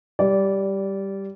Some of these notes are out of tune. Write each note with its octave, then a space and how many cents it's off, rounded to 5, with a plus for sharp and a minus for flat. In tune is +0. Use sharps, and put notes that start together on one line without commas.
G3 +0 D5 -20